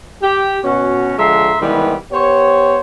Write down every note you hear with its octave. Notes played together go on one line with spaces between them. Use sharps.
G4
B2 C#4 F#4
D3 F3 G#3 E5 A#5 C6
C3 D#3 E3 G3 G#3 B3
B3 G4 C5 C#5